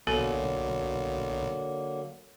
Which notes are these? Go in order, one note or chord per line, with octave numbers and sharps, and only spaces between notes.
B1 D3 F#3 A#3 B3 F#4 A4